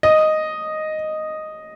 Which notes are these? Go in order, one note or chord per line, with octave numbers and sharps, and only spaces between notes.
D#5